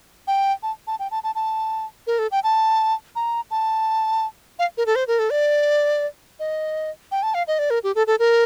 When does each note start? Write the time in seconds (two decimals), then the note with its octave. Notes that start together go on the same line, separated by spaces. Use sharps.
0.27 G5
0.63 A5
0.87 A5
0.99 G5
1.11 A5
1.24 A5
1.35 A5
2.07 A#4
2.19 A4
2.31 G5
2.44 A5
3.16 A#5
3.51 A5
4.59 F5
4.77 A#4
4.86 A4
4.96 C5
5.08 A#4
5.19 A4
5.30 D5
6.40 D#5
7.11 G5
7.23 A5
7.34 F5
7.48 D#5
7.59 D5
7.70 A#4
7.83 G4
7.95 A4
8.07 A4
8.19 A#4